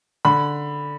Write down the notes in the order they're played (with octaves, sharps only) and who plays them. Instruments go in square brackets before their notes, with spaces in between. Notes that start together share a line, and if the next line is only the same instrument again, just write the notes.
[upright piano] D3 B5